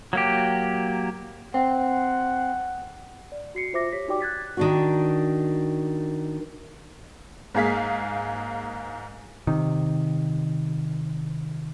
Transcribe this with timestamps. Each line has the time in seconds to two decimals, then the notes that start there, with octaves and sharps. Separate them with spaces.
0.13 F#3 A#3 G4
1.54 C4 F#5
3.32 D5
3.55 F#4 C7 C#7
3.73 F4 C5 E5 D6 A#6
3.93 G4 C#5 B6
4.08 D#4 F#4 G4 D5 G5 D6
4.21 F#6 G#6 A6 B6
4.57 D#3 D4 F#4
7.55 G#2 A#3 G#4 F5 B6
9.47 C3 D#3